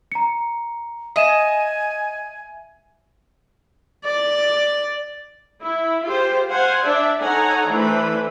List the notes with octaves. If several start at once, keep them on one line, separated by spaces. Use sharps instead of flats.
A#5 C#7
D#5 E5 G#5 D#7 E7
D5
E4
F4 G4 G#4 C5
C5 F5 F#5 G#5
D4 D5 E5
D#4 A4 C#5 F#5 G#5 A#5
E3 A3 D4 B4 C5